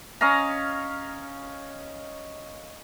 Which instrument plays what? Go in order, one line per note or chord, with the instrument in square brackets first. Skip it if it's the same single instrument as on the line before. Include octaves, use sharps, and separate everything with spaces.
[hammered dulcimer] C#4 D#5 F5 A#5